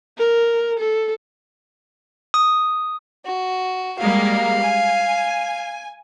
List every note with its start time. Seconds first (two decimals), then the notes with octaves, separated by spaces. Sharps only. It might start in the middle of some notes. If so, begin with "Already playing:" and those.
0.18 A#4
0.79 A4
2.34 D#6
3.25 F#4
3.99 G3 G#3 A#3 F5
4.62 G#5